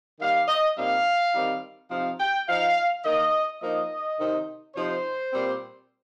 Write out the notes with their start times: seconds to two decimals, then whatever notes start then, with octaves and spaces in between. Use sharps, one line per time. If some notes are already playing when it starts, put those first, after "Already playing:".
0.20 D#3 G3 A#3 F5
0.48 D#5
0.77 A#2 G3 C4 D#4 F5
1.34 D#3 G3 C4 D#4
1.91 C3 F3 C4 D#4 F5
2.20 G5
2.48 F3 D#4 F5
3.05 D#3 A#3 D#4 D#5
3.61 F3 A#3 D#4 D#5
4.19 C3 D#3 C4 D#4
4.76 C3 F3 D#4 C5
5.32 A#2 G3 C4